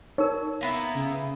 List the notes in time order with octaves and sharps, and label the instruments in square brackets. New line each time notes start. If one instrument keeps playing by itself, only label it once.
[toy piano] D#4 A#4 [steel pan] C#5
[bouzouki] A#3 B3 E4
[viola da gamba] C#3